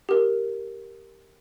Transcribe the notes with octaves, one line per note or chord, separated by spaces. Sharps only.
G4 A#4